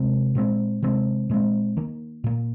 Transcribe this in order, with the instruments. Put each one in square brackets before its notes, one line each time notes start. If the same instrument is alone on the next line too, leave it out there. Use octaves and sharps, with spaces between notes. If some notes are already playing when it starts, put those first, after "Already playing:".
Already playing: [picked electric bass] C3 G#3 C4
A#2 G#3 C4
C3 D#3 G#3 C4
A#2 G#3 C4
D#3 A#3
A#2 A#3